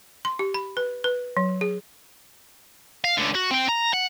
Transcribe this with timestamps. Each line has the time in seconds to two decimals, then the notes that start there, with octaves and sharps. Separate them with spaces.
0.25 C6
0.39 G4
0.54 B5
0.77 B4
1.04 B4
1.37 F#3
1.61 G#4
3.05 F5
3.18 C#2 D3
3.35 F#4
3.51 C4 G5
3.69 A#5
3.93 F#5